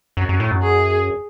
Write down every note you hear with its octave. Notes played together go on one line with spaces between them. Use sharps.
F#2
F#2
A2
F#2
G#4